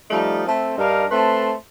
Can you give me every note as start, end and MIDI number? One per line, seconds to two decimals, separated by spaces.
0.11 0.46 53
0.11 0.46 55
0.11 0.46 57
0.11 0.46 63
0.46 0.76 57
0.46 0.76 60
0.78 1.06 43
0.78 1.06 62
0.78 1.06 63
0.78 1.06 70
0.78 1.06 77
1.11 1.52 57
1.11 1.52 60
1.11 1.52 71
1.11 1.52 81
1.11 1.52 84